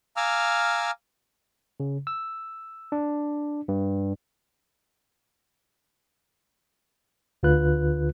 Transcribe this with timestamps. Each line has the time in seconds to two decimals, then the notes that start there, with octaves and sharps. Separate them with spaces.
0.17 F5 G#5 A#5 D6 E6 F6
1.80 C#3
2.07 E6
2.92 D4
3.68 G2
7.43 D2 D3 F4 B4 F#6